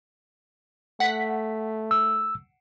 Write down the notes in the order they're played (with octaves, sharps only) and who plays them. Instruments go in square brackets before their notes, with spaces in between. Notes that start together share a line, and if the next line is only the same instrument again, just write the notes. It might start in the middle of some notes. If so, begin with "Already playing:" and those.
[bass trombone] A3 [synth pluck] F#5 B6
[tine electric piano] E6